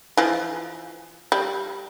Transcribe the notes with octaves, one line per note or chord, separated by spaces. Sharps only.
E3 F3
G3